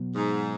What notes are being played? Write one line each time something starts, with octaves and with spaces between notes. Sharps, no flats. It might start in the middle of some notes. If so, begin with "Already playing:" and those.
Already playing: B2 F#3 B3
G#2